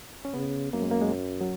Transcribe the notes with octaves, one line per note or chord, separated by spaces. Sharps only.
C#4
C#3 B3
F#2 A#3
G#3
A#3
G#3
F#3
F#3